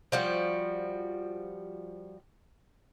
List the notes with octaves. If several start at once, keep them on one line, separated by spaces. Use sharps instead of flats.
F3 G3 F#4